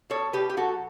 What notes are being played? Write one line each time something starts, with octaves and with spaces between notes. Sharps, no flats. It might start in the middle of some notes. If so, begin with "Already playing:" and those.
B2 A4 C#5
B2 G4 B4
G4
F#3 F#4 A4